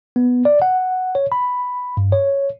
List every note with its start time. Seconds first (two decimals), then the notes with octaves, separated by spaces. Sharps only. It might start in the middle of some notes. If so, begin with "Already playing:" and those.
0.16 B3
0.45 D5
0.62 F#5
1.15 C#5
1.32 B5
1.97 G2
2.12 C#5